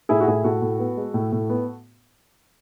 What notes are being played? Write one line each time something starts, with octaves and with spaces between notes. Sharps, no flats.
A2 E4 G#4
F#4
A2 E4 G#4
A2 F#4 A4
A2
B3
G#3
A2
A2
B3